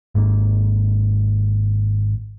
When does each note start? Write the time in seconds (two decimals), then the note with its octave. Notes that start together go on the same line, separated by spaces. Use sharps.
0.15 G#1 G#2 A#3